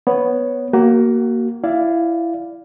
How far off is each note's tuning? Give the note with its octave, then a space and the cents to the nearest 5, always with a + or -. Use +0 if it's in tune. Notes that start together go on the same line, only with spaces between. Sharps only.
B3 +0 C#5 +0
A#3 +0 F#4 +25
E4 +15 D5 +0 F5 +0